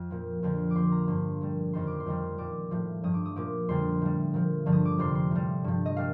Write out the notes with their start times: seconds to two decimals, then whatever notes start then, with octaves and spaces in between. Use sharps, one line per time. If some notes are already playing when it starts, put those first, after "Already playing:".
Already playing: F2
0.11 A#2 F3
0.43 F2 D3 F3
0.71 D6
0.76 A#2 F3 C6
0.92 A#5
1.08 G2 F3 C6
1.41 A#2 G3
1.73 F2 D#3 G3 C6
1.87 D6
2.00 C6
2.06 F2 D#3 G3
2.38 A#2 G3 D6
2.71 A2 F3
3.03 G2 F3 D#6
3.14 D6
3.25 D#6
3.36 A#2 F3 D6
3.69 F2 D3 G3 C6
4.02 A2 G3
4.34 A#2 F3
4.66 G2 D3 F3
4.73 D#6
4.85 D6
4.98 F2 C3 G3 C6
5.15 C6
5.31 A2 G3
5.64 G2 F3
5.86 D#5
5.97 A#2 G3 F5